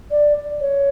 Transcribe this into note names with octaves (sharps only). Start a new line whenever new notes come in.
D5
C#5